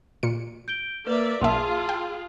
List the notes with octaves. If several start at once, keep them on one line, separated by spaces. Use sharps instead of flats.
A#2 C#7
G6 D7 G7
A#3 B4 D5 E5
B1 A#3 F4 G#4 E5 A5 C6
G5